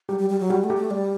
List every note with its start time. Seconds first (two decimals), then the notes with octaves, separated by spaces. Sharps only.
0.09 G3 G4
0.19 G3
0.30 G3
0.40 F#3
0.50 G3 F#4
0.64 A3
0.70 G4
0.77 A3
0.91 G3 D5